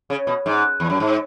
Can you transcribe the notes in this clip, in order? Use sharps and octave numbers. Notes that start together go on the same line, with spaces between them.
C#3
B2
G#2
E2
F#2
G#2